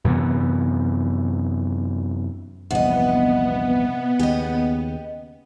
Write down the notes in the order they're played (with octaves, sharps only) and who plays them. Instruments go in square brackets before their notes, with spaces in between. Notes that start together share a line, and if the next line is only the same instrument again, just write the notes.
[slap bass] F#2 C3 E3 B3
[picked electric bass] A#1 E2 G2 [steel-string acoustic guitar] C3 D#5 [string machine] B3 [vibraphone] F#5
[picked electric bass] D#2 C#3 [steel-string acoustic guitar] G4 D#5